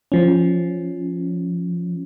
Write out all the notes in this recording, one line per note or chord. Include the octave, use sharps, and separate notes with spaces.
F3 C#4